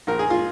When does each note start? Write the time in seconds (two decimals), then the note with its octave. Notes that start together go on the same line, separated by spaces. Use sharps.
0.07 A#1 A#4
0.19 G#4
0.30 F4